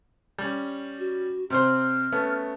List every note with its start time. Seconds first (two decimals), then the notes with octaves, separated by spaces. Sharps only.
0.38 G3 C#4
0.99 F#4
1.50 C3 C4 C5 F6
2.12 A3 B3 C#4